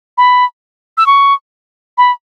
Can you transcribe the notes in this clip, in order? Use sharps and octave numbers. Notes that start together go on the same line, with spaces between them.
B5
E6
C#6
B5